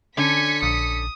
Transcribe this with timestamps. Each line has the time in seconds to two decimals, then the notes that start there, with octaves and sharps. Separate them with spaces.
0.17 D3 C#4 G#5 B6 C#7
0.63 A#1 D#6